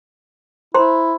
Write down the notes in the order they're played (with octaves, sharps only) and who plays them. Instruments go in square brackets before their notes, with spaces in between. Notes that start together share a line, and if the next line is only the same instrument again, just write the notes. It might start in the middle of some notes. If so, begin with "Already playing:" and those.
[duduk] E4 [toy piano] C5 A#5 C6